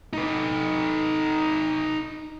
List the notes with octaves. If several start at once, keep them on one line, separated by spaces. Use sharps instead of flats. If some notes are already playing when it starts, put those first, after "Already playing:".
D#4 B4